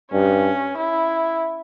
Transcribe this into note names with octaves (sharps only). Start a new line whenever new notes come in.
G2 C#4
E4